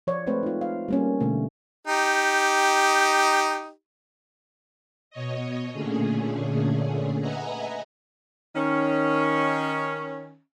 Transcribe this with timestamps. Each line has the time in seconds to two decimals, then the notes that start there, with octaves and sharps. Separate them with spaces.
0.07 F3 C#5 D5
0.26 G#3 A3 C4 B4 C5
0.43 D#4 F4
0.61 F5
0.88 G3 A#3 C#4
1.20 B2 D3 A3
1.87 D#4 G4
5.11 B2 C#5 D#5
5.73 A#2 D3 A3 C#4 G#4
7.19 B4 D#5 E5 F#5 G#5 A#5
8.56 D#3 C#4